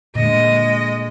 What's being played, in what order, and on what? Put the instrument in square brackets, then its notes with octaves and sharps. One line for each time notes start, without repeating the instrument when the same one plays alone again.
[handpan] A#2 D3 [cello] G#3 D#5